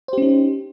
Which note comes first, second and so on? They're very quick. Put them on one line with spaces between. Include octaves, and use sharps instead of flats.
C5 G4 C#4 D#4